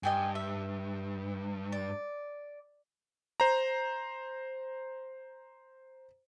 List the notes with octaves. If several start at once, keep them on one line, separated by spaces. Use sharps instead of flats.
G2 D#5 G5 G#5
E5
D5
C5 A#5